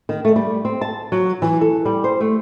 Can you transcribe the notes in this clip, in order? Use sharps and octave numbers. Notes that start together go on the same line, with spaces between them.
D#3
A3
G3
C4
A5
F#3
E3
A4
G3
C5
A3